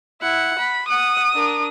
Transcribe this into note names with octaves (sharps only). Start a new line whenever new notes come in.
E4 F#5
B5
F#5 D#6
D4 A#4